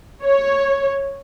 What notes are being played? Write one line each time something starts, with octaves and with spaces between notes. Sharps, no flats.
C#5